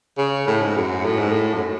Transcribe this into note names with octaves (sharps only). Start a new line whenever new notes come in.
C#3
A2
G#2
F#2
A2
G#2
A2
F#2